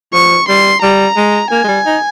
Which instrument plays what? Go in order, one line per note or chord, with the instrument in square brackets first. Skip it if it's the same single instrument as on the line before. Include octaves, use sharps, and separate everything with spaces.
[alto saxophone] F3 [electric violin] C#6
[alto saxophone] G3 [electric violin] C6
[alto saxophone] G3 [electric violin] A#5
[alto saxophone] G#3
[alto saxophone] A#3 [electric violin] G#5
[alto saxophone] G#3
G3
D#4